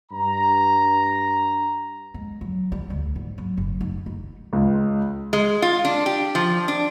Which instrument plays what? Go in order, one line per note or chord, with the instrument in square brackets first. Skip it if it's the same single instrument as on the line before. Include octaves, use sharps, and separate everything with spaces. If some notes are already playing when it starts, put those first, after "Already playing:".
[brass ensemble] G2 A#5
[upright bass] G#3
F#3
G3
D2
G#2
F#3
F#1
D#4
D#4
[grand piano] C#2
[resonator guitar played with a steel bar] G#3
F4
D4
G4
F3
D4